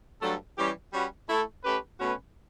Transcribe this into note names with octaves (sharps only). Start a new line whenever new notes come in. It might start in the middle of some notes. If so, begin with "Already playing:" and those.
G2 F#3 A3 D4 A4
E3 G3 C#4 G4
G3 C#4 F#4 B4
A3 E4 A4
A3 C#4 G4 B4
B2 A3 C#4 F#4 B4